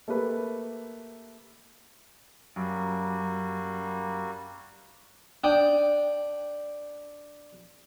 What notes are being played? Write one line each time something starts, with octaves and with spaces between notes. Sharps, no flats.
A3 A#3 G4 B4
F#2 G3 A#3 F#4
D4 G5 D#6